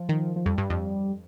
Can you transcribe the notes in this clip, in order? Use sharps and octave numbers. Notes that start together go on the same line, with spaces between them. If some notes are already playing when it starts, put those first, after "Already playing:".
Already playing: F3
D#3
F3
F2 G3
G2
F2